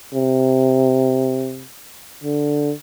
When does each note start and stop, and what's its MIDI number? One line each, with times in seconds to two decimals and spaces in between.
0.15 1.66 48
2.24 2.72 50